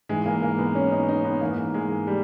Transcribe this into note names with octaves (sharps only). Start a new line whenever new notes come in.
G#2 E3 G#3
A#3
A#3
B3
C#4
D#4
D#4
B3
G#2 E3 A#3
G#3
G3